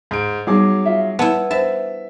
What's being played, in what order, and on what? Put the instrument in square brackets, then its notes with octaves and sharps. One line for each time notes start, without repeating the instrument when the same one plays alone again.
[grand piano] G#2 D7
[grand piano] F#3 G#4 D6 [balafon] G3 B3 D#4
[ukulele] F4 E5
[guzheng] B3 E4 [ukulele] G#5 [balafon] A5
[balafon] D4 C5 [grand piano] E5 [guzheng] A5